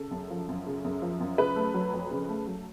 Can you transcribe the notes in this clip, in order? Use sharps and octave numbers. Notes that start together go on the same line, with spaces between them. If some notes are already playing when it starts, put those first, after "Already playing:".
Already playing: C#3 A4
F#2
F3
F#2
C#3
F#2
F3
F#2
C#3 B4
A3
F#3
F2
C#3
A3
F#3